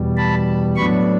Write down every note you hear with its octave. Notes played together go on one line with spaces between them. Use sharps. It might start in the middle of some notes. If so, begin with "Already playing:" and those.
Already playing: E2 B2 G3
A5 B5
A2 F#3 B3 D4 B5 C#6